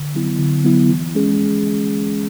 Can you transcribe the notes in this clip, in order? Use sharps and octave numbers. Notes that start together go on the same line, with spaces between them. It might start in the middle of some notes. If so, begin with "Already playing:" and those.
Already playing: D3
F#3 B3 E4
D3
F#3 B3 E4
E3
G#3 C#4 G#4